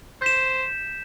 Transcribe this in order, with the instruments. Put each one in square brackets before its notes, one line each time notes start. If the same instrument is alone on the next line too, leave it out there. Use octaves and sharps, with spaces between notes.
[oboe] C5 [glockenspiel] G6 B6 E7